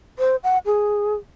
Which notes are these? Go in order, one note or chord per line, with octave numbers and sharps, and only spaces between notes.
C5
F#5
G#4